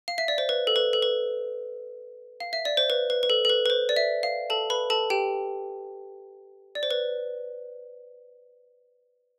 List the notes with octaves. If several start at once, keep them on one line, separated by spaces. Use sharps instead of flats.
F5
E5
D5
C5
B4
A4
B4
A4
B4
F5
E5
D5
C5
B4
B4
B4
A4
A4
B4
B4
C5
D5
E5
F5
A4 A5
B4 B5
A4 A5
G4 G5
D5
C5
B4